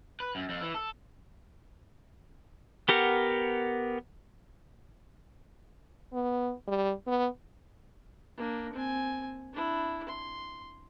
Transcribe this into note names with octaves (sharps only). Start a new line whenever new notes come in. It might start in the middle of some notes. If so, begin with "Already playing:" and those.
B4
F#2
F2
E3
A4
B3 G4 A#4 F#5
B3
G3
B3
A#3 D4
C4 G#5
D4 E4
C6